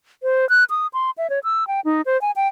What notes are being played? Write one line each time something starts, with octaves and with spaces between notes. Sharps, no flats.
C5
F#6
D#6
C6
E5
C#5
E6
G5
D#4
C5
G#5
G5